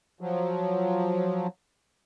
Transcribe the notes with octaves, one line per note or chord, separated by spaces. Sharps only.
F3 F#3